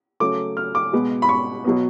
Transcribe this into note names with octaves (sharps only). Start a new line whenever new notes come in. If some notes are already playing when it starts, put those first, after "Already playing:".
C#3 F#3 A3 D6
F6
D6
B2 G#3 B3
B5
C#6
B2 F#3 B3